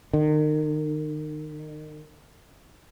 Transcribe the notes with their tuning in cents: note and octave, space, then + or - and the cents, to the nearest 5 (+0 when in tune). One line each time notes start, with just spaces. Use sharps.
D#3 -30